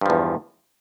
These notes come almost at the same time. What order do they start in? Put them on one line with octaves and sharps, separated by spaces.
G2 F3 E2